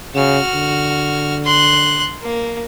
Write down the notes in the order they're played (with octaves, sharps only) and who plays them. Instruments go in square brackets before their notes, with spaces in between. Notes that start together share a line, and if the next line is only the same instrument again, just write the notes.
[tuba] C#3 [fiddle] F#4 F6
[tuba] D3
[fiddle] C6 F#6
A#3